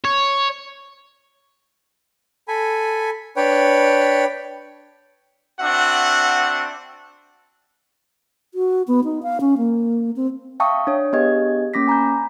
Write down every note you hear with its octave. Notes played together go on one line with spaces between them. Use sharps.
C#5
A4 G#5 B5
D4 B4 C#5 G5
C4 D4 F#4 E5 F#5
F#4
B3
D#4
F5
C#4
A#3
C4
E5 F5 G5 A5 C#6 D#6
D4 C#5
B3 D4 G4 G#4 D#5 G#6
A#3 C#4 D6 A#6 B6
G#5 A#5 B5 G6